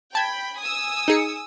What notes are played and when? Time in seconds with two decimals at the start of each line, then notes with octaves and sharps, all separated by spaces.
0.15 G5 A5 B5 G#6
0.58 G#5 D#6 E6
1.08 D#4 G#4 C#7